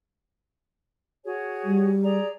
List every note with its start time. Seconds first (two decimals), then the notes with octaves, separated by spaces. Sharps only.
1.25 F#4 G#4 C#5
1.64 G3
2.03 G#4 D5 A#5